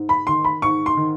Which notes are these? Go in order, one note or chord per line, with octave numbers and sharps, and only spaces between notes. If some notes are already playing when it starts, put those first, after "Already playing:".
Already playing: G#2
B5
D#3 C6
B5
G#2 C#6
C6
D#3